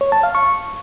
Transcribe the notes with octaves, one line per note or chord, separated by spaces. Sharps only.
C#5
A5
F5
C#6